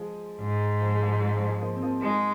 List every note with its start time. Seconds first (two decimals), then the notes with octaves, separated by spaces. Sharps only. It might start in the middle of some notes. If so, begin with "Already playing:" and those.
Already playing: F3 G#3
0.41 G#2
0.81 F3
0.95 G#3
1.02 F3
1.08 G#3
1.22 G#3
1.36 F3
1.49 G#3
1.61 F3 A#3
1.76 C4
1.82 F3 A#3
2.02 G#3 D#4 G#4